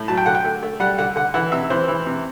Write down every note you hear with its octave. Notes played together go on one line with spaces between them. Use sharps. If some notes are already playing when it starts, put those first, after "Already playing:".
Already playing: A2
F#3 A5
G5
D3 F#5
G5
A3
A3
G3 F#5
D3 F#5
D3 F#5
E3 F#5
C3 E5
E3 C5
E3
C3